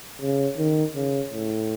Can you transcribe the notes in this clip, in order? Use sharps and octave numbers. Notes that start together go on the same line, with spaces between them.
C#3
D#3
C#3
A2